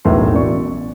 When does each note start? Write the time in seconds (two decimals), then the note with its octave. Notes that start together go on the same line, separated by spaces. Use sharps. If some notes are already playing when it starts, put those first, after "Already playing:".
0.05 E1 B1 A2 B3 E5 C6
0.33 A1 B2 D5 C#6